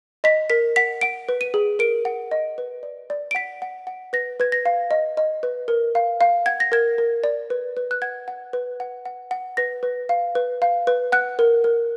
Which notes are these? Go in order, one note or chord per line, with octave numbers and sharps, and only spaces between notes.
D#5 B6
A#4 B6
F#5 B6
F#5 D7
B4
D#7
G#4
A#4 D7
F#5
D#5
B4
D5
D5
D7
F#5 B6
F#5
F#5
B4 A#6
B4 G#6
A#6
F5
D#5
D#5
B4
A#4
F5
F5
F#5 G#6
A#6
A#4 G#6
A#4
D5
B4
B4
F#6
F#5 G#6
F#5
B4
F#5
F#5
F#5
B4 A#6
B4
F5
B4
F5
B4
F#5 F#6
A#4
A#4